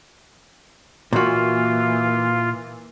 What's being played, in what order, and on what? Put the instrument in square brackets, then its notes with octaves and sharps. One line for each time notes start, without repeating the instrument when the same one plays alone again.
[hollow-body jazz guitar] A#2 F#4 [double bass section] E3 A#3 [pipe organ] F4